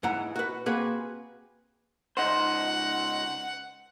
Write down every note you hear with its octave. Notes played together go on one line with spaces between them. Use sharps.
G#2 E3 F#5 A#5
F#4 B4
A#3 C4 F#4 G#4 B4
C#2 D#4 C5 F#5